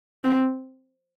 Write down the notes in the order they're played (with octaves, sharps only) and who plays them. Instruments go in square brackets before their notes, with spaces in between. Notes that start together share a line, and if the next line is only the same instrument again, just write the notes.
[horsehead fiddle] C4